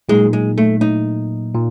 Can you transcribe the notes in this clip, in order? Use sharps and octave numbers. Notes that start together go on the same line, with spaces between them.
A#2 F#3 G#3 A#3 D#4
G#3
A3
D#4
A#2